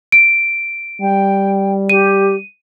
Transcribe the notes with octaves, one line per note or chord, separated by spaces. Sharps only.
D7
G3 G5
G4 D#7